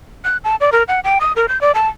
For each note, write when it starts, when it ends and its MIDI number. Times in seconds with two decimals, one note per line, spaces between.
0.24 0.37 90
0.44 0.56 81
0.60 0.70 74
0.72 0.83 70
0.88 1.00 78
1.04 1.19 79
1.21 1.32 87
1.36 1.46 70
1.48 1.60 91
1.61 1.72 74
1.75 1.88 81